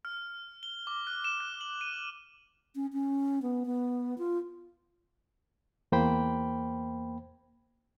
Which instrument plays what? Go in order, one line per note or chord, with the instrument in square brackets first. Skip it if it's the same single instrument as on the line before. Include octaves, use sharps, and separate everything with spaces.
[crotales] F6
G7
D6
F#6
E7
F#6
F#7
D#7
[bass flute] C#4
C#4
B3
B3
F4
[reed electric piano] E2 A#3 C5 G5 B5